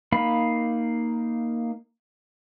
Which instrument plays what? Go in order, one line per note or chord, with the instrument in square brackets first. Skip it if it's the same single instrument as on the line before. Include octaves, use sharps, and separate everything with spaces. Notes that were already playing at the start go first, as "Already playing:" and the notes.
[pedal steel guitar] A#3 D#4 F5 B5